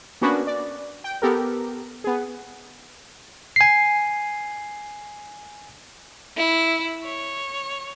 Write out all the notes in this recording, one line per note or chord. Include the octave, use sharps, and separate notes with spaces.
A#3 B3 C#4 D4 F#4 B4
D5
G5
B3 G4 A4 A#4
B3 G#4
G#5 C7
E4
C#5